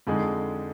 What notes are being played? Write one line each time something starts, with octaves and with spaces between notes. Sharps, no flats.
F2 D3 G#3 D#4 G#4